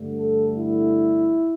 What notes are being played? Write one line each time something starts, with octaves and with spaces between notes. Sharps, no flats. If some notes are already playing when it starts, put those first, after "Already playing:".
Already playing: G2 D3 A3
A4
E4